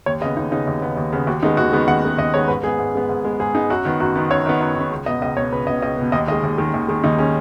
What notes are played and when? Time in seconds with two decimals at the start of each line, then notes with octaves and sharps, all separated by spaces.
0.06 D#2 C#5
0.21 C#3 D#5
0.25 B3
0.37 D#2 D#4
0.52 C#3 B3 D#4
0.67 D#2
0.82 C#3 B3
0.97 D#2
1.13 C#3 B3
1.27 D#2 F#4
1.43 D#3 G#3 B3 D#4
1.57 D#2 F#4
1.73 D#3 G#3 B3
1.88 D#2 F#5
2.03 D#3 G#3 B3
2.18 D#2 D#5
2.34 D#3 G#3 B3 C#5
2.48 G#2 B4
2.63 G#3 B3 G#4
2.79 G#2
2.95 G#3 B3
3.09 G#2
3.25 G#3 B3
3.40 G#2 G#4
3.55 G#3 B3 D#4
3.70 F#2 F#4
3.85 D#3 B3
4.00 F#2 F#4
4.15 D#3 B3
4.30 F#2 C#5
4.46 D#3 B3
4.61 F#2
4.76 D#3 B3
4.91 C#2
5.06 B2 B3 D#5
5.22 C#2 D#5
5.37 B2 B3 C#5
5.52 C#2 B4
5.67 B2 B3 D#5
5.82 C#2 D#5
5.97 B2 B3
6.12 D#2 D#5
6.27 D#3 G#3 D#5
6.43 D#2
6.58 D#3 G#3
6.74 D#2
6.88 D#3 G#3
7.04 D#2 D#4
7.18 D#3 G#3 C#4